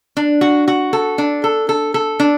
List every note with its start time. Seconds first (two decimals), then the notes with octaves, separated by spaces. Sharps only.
0.17 D4
0.41 F#4
0.68 F#4
0.93 A4
1.18 D4
1.44 A4
1.69 A4
1.94 A4
2.20 D4